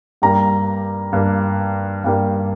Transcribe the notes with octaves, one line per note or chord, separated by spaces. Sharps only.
G2 G3 A#3 A#5
G2 G3 A#3
G2 G3 A#3